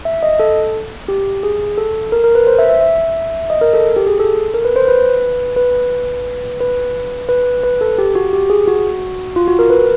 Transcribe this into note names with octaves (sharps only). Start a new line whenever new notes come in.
E5
D#5
A4
G4
G#4
A4
A#4
A#4
B4
C5
E5
E5
E5
D#5
A#4
A4
G4
G#4
A4
A#4
B4
C5
B4
B4
B4
B4
B4
A4
G4
F#4
G4
G#4
F#4
F4
F#4
A#4
B4